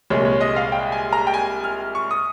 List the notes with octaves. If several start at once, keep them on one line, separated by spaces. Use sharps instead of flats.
C2 A#2 G#3 C#5
C#5
D#5
F5
G5
G#5
A#5
G5
G#5
F6
C#6
D#6